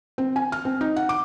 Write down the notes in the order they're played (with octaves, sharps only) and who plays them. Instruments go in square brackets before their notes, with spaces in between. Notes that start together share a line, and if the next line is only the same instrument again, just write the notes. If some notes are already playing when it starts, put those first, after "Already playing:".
[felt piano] C4
G#5
F6
C4
D#4
F#5
D6